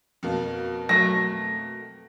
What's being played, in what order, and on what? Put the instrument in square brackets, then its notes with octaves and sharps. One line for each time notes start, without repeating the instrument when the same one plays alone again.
[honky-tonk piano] F2 B2 A#3
[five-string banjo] F#3 A3 [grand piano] A#6